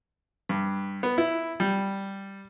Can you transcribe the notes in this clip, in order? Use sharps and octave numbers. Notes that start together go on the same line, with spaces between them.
G2
B3
E4
G3